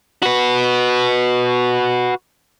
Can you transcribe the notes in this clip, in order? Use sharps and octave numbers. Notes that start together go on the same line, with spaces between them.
F#4 B4